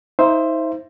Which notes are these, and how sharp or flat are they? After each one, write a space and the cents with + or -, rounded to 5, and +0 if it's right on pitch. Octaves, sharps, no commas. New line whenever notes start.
D#4 +40 C5 +0 E5 +30